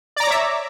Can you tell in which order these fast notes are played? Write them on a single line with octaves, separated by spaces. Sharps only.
D5 A#5 D6 C#5 E5